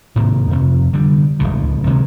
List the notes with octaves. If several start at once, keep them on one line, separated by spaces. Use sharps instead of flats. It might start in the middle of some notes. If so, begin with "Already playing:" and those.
G#2 C3 D#3 A#3
F2 C3
D3 G3
D1 G1 C#2 B2
C3 D#3 F#3 G#3